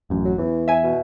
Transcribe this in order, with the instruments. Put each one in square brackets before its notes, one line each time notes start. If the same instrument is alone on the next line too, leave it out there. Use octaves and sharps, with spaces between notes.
[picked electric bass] A1 F#2
[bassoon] F#3
[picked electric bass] E2 [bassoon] E3
[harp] E5 G#5
[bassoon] B2